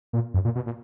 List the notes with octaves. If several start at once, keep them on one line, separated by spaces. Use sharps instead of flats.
A#2
F#2
A#2
B2
A#2